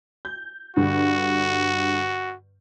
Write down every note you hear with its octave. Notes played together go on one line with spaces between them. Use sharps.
G6
G2 D3 F#4